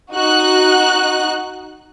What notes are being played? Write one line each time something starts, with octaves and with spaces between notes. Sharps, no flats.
D#4 F#4 F#6